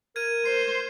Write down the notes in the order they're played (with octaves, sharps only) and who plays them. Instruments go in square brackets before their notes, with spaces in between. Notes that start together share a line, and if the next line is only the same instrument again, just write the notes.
[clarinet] A#4 [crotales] G#6 D#7
[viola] C5 [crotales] C7